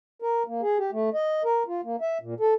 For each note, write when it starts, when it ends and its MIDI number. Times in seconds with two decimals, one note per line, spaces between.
0.22 0.43 70
0.47 0.61 58
0.62 0.78 68
0.78 0.91 67
0.93 1.09 57
1.14 1.42 75
1.45 1.63 70
1.68 1.81 65
1.85 1.96 58
2.01 2.18 76
2.22 2.34 46
2.40 2.54 69